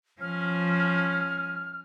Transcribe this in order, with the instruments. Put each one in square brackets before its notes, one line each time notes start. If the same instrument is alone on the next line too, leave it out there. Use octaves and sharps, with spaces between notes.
[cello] F3 C#4 [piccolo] F6